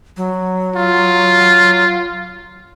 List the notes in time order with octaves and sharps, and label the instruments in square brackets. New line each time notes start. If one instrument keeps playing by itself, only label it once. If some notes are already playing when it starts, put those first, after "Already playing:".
[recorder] F#3
[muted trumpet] F4